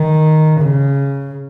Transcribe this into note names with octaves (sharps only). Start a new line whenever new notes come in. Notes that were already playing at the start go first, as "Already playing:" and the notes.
Already playing: D#3
C#3